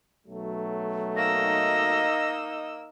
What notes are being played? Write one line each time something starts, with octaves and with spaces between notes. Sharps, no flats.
B1 F#3 A3
A#3 D#4 D#5 E6 A#6